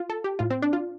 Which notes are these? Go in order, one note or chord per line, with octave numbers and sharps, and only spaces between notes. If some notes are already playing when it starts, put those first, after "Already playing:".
Already playing: F4
A4
G4
A2 F4
C4
D4
F4